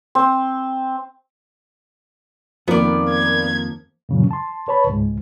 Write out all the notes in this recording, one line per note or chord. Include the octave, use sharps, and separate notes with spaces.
C4
F2 D#3 F3 A#3 B3 D5
G#6
F#2 A#2 C#3 E3 F#3
A5 C6
B4 C#5 A5 B5
C#2 G#2